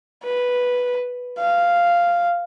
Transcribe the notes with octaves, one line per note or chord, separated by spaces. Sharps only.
B4
F5